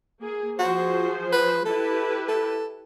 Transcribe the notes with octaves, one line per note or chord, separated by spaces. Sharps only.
A#3 G#4
F3 F#4 G#4 C5
B4
E4 G4 A4 B4
A4